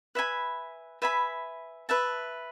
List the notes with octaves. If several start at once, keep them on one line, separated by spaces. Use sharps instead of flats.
B4 E5 G#5 B5
B4 E5 G#5 B5
B4 E5 A5